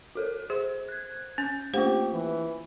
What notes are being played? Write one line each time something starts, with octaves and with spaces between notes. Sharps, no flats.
F#4 A4 A#4
G#4 C5
F#6 G#6
C#4 G6
A3 A#3 F4 G4 C5
E3